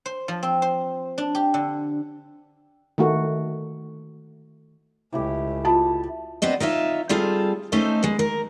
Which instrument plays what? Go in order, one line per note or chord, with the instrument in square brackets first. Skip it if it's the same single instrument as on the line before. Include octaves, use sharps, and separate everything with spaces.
[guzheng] C5
F3
C4
C5
D4
G4
D3
[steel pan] D#3 A3 F#4
[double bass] C#2 [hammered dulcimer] A2 E4 G4
[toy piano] F4 F#4 D#6 [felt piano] A5
[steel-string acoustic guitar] B3 C4 D4 D#5
D#4 F4 C#5 E5
G3 C4 F4 G#4 A4
A3 C#4 D#4 A4 C5
B2 G#3
A#4